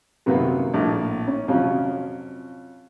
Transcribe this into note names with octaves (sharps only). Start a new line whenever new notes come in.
F#2 C3 D#3 F#3 A#3 B3
A#1 A2
C#4
F2 C3 F3 F#3 C#4